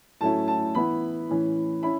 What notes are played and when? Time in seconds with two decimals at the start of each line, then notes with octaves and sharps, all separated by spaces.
0.21 A2 F#3 A3 C#4 E4 A5
0.48 A5
0.75 E3 B3 E4 B5
1.29 A2 E3 C#4
1.83 C#4 E4 B5